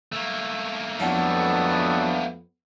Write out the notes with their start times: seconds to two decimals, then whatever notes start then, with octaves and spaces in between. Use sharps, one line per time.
0.12 A3 A#3
1.00 F2 F#3 B3 D4 E4 F#5